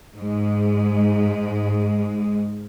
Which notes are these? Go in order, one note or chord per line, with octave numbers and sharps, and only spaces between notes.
G#2 G#3